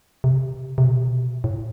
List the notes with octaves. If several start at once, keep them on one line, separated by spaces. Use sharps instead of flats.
C3
C3
B2
A2